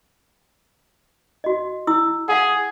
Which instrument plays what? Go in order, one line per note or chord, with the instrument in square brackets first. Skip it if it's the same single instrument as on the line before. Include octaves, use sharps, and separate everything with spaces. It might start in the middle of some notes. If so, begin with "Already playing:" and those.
[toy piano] F#4 D#5
E4 D#6 E6
[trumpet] G#4 [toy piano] F5 F#5